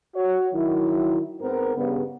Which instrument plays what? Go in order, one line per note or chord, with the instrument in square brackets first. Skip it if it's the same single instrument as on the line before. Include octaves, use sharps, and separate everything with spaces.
[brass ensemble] F#4 C#5
D#3 F#3 E4
G#2 B3 C4 A#4
G2 C#3 B3